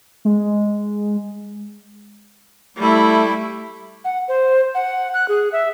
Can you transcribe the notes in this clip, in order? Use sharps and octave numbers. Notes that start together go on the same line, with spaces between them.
G#3
G3 A3 E4
F#5
C5
F#5
F#6
G#4
E5